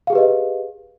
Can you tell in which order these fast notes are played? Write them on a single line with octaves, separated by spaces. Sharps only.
F5 G#4 G4 B4 D#5